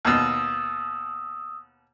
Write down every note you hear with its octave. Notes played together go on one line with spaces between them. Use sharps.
D#2 B2 D#6 E6